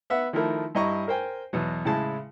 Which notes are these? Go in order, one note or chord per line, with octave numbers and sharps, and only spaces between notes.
B3 E5 F#5
D#3 F3 A3 E4 A#4
G2 E4 D#5 A#5 C#6
A#4 C5 G5 G#5
E2 B2 F#3
A2 C#3 G#3 E4 A5